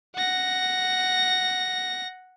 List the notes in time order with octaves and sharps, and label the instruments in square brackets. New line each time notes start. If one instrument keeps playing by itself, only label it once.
[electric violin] F#5 A#6